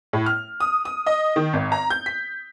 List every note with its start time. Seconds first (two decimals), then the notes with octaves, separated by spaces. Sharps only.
0.13 A2
0.26 F6
0.60 D#6
0.85 D#6
1.06 D#5
1.36 D#3
1.53 G#1
1.72 A#5
1.90 G6
2.06 B6